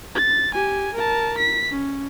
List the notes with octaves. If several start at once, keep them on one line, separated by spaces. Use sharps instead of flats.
A6
G4 G#5
A#4 A5
B6
C#4